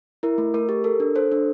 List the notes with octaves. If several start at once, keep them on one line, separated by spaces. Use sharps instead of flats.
E4 A#4
A3
A3 A#4
G4
A4 A#4
D4
A4 C5
D4